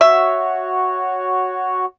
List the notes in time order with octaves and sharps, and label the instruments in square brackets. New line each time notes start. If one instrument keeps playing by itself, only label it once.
[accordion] F#4 C#5 [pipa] E5